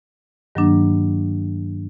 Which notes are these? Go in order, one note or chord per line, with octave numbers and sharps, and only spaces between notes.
G2 D#3 F#3 A#3 D4